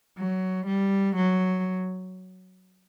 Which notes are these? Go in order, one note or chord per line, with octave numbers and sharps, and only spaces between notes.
F#3
G3
F#3